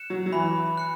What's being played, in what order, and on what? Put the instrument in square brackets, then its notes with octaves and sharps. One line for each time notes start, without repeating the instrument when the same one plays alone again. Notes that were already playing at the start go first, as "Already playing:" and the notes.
Already playing: [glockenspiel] F#6 C#7 E7
[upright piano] F#3
F#3
[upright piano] E3 [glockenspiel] B5
[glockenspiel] F#6 C#7